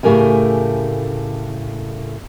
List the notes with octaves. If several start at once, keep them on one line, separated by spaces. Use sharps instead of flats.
A2 C#3 A3 G4 A#4 G#5